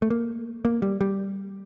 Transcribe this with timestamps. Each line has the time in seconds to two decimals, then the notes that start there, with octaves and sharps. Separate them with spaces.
0.02 A3
0.10 A#3
0.65 A#3
0.82 G3
1.01 G3